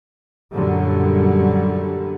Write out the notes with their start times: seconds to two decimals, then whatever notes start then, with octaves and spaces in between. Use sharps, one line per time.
0.52 F#2 A#2 D3 F#3 G3